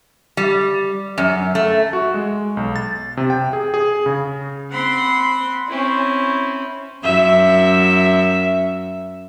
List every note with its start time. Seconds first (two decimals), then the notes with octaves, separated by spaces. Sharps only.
0.37 G3
1.18 F#2
1.55 A3
1.93 F#4
2.14 G#3
2.57 B1
2.76 A6
3.17 C3
3.30 G5
3.53 G#4
3.74 G#4
4.06 C#3
4.71 C4 F#5 B5 C6
5.69 C4 C#4 E4
7.04 F#2 E5